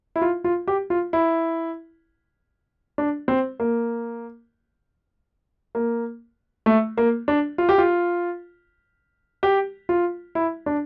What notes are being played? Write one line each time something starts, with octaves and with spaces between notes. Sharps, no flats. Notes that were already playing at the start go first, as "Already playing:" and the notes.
E4
F4
F4
G4
F4
E4
D4
C4
A#3
A#3
A3
A#3
D4
F4
G4
F4
G4
F4
E4
D4